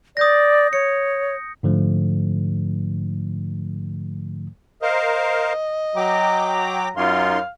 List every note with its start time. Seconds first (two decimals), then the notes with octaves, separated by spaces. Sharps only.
0.17 D5 D#6 G6 A#6
0.73 C#5 C#7
1.63 G#2 D3 F3 A3
4.82 A#4 C5 D#5 F5
5.96 F#3 G5 A#5 D6
6.97 F#2 D#4 F4 F5 C6